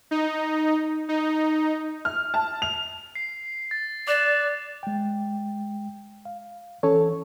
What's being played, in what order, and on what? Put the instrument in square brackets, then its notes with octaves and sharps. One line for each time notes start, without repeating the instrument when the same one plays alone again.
[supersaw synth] D#4
D#4
[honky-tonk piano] F6
A5
F7
[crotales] C7
A6
[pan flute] D5 [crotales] D6 F#6 E7
[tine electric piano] G#3 G5
F5
[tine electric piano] E3 [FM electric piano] C#4 A4 C#5